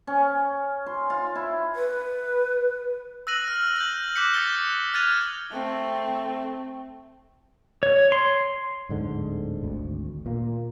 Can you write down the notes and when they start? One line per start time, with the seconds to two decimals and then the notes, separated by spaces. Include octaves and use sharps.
0.07 C#4
0.86 C6
1.10 F4
1.35 E4
1.75 B4
3.27 E6 F#6 A#6 D#7 F#7
3.48 F6
3.76 G6 A#6 F#7
4.16 D6 F#6 G6 B6 C#7
4.34 D#6 G6 A6 C#7 G7
4.94 F6 F#6 G#6 A6 D#7 F7
5.52 A3 C4
7.83 C#5
8.12 C6
8.89 D1 G#2 D3
9.63 G#1 D2
10.26 A#2 A#3